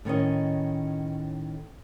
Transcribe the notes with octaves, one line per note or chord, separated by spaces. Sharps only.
A2 D#3 C#4 D#5